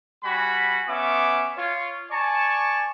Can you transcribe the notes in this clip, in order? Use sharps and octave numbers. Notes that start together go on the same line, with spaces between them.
G3 F#4 G#5 B5
B3 C#4 E5 D6
F4 C#5
D5 G#5 A5 C#6